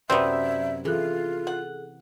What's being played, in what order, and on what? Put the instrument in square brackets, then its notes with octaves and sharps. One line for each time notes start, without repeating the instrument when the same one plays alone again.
[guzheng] F#2 C3 F#3 [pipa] B3 C4 [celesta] D5 G6 [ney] E5
[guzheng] E3 [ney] F4 [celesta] G#4 A4 F#6
[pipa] F#5